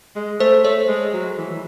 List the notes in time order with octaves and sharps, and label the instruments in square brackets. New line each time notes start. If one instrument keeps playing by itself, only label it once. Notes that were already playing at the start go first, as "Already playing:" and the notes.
[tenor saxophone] G#3
[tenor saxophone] A3 [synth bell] C5
[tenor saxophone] A3 [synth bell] C#5
[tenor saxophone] G#3
F#3
E3
E3